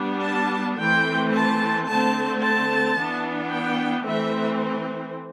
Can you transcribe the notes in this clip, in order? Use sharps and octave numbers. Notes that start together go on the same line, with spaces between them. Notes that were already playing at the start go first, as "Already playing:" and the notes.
Already playing: G3 B3 D4
A5
E3 A3 C4 G5
A5
D3 A3 C4 A5
A5
E3 B3 D4
G5
E3 A3 C4 E5